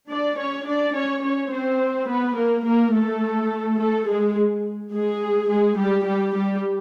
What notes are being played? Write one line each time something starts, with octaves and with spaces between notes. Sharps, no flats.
D4 D5
C#4 C#5
D4 D5
C#4 C#5
C#4 C#5
C4 C5
B3 B4
A#3 A#4
A#3 A#4
A3 A4
A3 A4
G#3 G#4
G#3 G#4
G#3 G#4
G3 G4
G3 G4
G3 G4